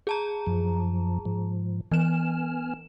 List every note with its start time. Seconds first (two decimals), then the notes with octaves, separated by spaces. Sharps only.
0.07 G#4 A5 A#5
0.47 F#2 F3
1.25 G#2 F3
1.92 E3 B3 G#5 F6 E7